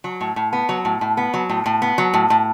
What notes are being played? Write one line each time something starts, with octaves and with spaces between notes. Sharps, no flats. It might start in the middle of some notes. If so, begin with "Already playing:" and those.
F#3
A2
A2
B3
F#3
A2
A2
B3
F#3
A2
A2
B3
F#3
A2
A2